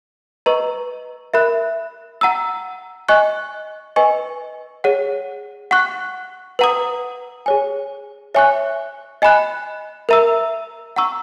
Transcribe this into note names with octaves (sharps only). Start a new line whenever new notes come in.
B4 D#5 A#5 C#6
A#4 E5 B5 F#6
F#5 A#5 E6
D#5 G#5 C#6 F#6
B4 D#5 G#5 C#6
G#4 C#5 F#5
F#5 C#6 F#6
B4 F#5 A#5 D#6
G#4 C#5 G#5
C#5 E5 G#5 C#6 F#6
D#5 G#5 B5 F#6
A#4 E5 A#5 E6
F#5 A#5 C#6 E6